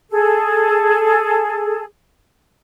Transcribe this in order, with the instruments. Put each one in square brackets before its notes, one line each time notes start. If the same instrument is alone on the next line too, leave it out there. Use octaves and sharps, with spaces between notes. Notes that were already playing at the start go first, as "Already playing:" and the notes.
[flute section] G#4 A4